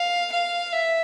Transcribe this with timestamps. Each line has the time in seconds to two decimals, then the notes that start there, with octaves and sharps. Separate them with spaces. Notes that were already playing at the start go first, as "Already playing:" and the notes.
Already playing: F5
0.32 F5
0.73 E5